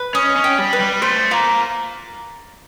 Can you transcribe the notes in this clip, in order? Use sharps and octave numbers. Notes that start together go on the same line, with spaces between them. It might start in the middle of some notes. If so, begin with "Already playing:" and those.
Already playing: B4
C#4 D#5
C#4
G5
G3
B4
G3
A3 C5
A#3 F4